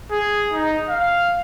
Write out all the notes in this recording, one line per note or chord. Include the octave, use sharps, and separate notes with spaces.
G#4
D#4
F5